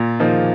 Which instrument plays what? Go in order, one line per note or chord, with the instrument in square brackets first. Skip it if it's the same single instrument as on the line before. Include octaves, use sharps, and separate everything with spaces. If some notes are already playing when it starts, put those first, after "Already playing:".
Already playing: [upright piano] A#2
F3 A#3 D#4